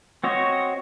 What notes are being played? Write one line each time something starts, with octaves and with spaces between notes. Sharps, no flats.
C4 F#4 C#5 D#5